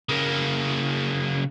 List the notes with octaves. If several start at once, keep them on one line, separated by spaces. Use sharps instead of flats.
C#3 A#3